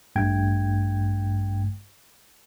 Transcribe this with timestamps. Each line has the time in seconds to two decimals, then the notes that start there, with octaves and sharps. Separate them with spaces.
0.16 A1 G2 A3 G5 G#6